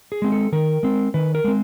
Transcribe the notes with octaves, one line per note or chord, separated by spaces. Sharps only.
G#4
G#3 C4
A4
D#3 A#4
G#3 C4
D#3 B4
A#4
G#3 C4